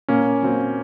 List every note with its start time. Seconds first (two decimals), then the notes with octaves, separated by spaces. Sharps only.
0.08 A#2 A#3 C#4
0.42 F#3 C4